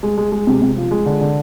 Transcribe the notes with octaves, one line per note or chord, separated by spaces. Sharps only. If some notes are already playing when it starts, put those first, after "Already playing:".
G#3
G#3
G#3
C3
C3
F3
G#3
D3
D3